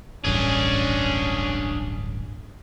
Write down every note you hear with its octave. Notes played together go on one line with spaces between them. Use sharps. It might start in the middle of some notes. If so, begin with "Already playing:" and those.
D1 A1 G2 C#4 D4 G#4